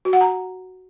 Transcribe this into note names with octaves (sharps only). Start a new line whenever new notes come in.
F#4
F#5
A#5